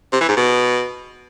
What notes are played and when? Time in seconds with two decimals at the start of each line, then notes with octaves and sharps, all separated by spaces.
0.13 C3
0.21 E3
0.29 G#2
0.37 B2